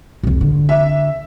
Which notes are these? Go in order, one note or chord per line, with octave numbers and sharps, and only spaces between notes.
C2 F2
D3
E5